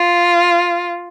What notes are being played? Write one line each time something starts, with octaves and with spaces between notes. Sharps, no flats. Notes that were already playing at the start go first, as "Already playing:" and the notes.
Already playing: F4